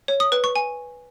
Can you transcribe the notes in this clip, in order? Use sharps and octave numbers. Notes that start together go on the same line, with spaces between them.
C#5
D#6
B4
C#6
G#5